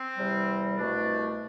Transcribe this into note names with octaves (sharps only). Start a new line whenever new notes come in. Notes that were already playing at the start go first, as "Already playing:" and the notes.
Already playing: C4
E2 C3 G3
C2 B2 A3 D4